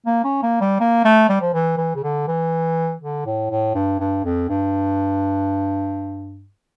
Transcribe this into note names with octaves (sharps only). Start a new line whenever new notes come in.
A#3
C#4
A#3
G3
A#3
A3
G3
F3
E3
E3
C#3
D3
E3
D3
A2
A2
G2
G2
F2
G2